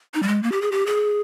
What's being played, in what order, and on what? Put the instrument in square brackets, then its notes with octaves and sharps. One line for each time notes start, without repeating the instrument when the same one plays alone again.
[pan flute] D#4
G3
G#3
A#3
G4
G#4
G4
G#4